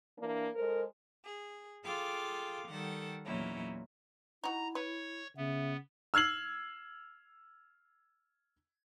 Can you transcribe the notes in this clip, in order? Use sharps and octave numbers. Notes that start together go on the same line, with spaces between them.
E3 A#3 D4
G#3 A4 A#4 C5
G#4
F4 G#4 A4 F5 G5 D6
D#3 G3 A4 F#5
E2 A#2 F#3 C#4 D#4 E4
D#4 E4 F#4 A#5
B4 C#5 C#6
C#3 B3 E5
E6 F6 G#6 C7 F#7